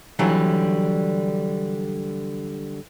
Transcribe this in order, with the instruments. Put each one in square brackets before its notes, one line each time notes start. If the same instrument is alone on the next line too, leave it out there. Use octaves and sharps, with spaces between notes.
[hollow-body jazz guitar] D3 E3 F#3 G3